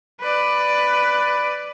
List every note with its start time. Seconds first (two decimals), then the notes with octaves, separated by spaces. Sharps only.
0.20 B4 D5